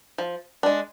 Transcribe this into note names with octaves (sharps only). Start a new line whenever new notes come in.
F3
G#3 D4